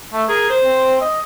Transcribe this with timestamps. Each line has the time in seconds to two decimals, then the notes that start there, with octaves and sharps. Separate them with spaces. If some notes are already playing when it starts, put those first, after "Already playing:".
0.13 A3
0.29 G#4 A#4
0.50 C5
0.64 C4
1.01 D#5